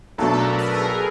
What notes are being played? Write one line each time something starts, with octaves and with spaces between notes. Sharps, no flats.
B1 B2 F#3 A3 D4 A4
B4
A#4
A#4
G#4